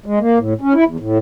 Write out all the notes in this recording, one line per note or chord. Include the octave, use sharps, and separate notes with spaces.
G#3
A#3
A2
C#4
E4
E2
A2